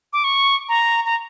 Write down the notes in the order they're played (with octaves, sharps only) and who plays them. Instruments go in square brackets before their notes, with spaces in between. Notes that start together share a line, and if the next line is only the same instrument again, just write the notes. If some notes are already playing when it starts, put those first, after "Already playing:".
[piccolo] D6
C#6
A#5
A#5